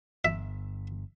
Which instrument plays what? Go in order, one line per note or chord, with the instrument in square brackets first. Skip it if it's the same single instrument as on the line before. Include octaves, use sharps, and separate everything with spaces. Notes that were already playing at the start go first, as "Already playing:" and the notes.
[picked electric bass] G1 [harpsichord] E5